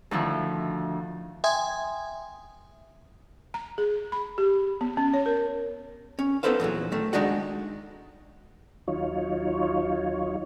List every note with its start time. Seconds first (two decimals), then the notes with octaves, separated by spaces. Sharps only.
0.11 D2 D#3 F3 E4
1.44 E5 G5 G#5 C6 D#6 G#6
3.54 A#5
3.78 G#4
4.12 B5
4.38 G4
4.81 B3
4.97 C#4
5.14 C#5
5.26 A#4
6.19 C#4
6.43 B3 D#4 A4 B4 C5 F5
6.60 E2 A#2 D3 F#3
6.92 D#3 A3
7.13 D#3 G#3 D4 D#4 F#4 F#5
8.87 D#2 F#3 D#4 F4 C#5